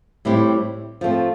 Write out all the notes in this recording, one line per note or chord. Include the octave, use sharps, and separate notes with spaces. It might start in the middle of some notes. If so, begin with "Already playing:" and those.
A2 G3 C4 E4 G4
F3 A3 C4